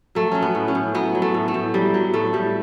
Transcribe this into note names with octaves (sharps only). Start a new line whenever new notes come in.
F#3 A3
F#3 C#4
B3
A2
C#4
A2
F#3 B3
F#3
A3
A2
A3
A2
F#3 G3
F#3
A2 A3
A2 G3